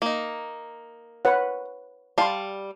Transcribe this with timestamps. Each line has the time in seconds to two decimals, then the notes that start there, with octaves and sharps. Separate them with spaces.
0.02 A#3 D#4
1.25 B4 C#5 F#5
2.18 G3 F5 A5 C6